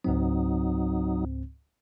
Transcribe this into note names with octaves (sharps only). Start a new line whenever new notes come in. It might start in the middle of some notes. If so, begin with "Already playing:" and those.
C#2 G#2 F#3 C4 D#4